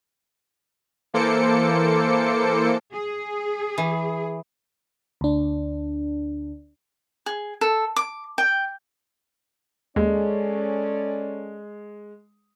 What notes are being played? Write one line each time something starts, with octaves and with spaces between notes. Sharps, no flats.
E3 A#3 A4 C5 D6 C#7
G#4
E3
D2 D4
G#4
A4
D6
G5
D#2 G#3 C#4 A4 D5